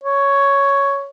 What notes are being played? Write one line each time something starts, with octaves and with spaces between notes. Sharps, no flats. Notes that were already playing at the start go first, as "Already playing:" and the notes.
C#5